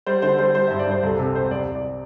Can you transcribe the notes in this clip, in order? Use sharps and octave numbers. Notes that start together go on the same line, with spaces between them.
G3 C5
D3 C5
G3 C5
G3 C5
G2 E5
D5
G2 C5
C2 A4
C3 A4
C3 C5
C2 D5
C2
D5